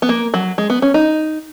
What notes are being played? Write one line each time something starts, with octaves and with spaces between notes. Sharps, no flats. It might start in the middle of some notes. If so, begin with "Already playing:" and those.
B3
A#3
F#3
G#3
B3
C#4
D#4